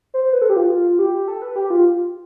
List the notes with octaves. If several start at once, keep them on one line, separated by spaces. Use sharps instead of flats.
C5
B4
A4
G4
F4
F4
G4
A4
B4
G4
F4